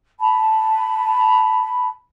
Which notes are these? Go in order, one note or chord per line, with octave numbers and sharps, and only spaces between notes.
A5 B5